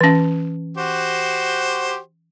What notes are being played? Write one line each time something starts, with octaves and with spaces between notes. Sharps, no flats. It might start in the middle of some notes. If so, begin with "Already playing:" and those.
E3 C#4
F#4 G4 C5